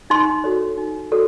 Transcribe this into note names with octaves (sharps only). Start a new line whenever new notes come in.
D#4 C6
F#4 A4 C#5
D#4
F#4 A4 C#5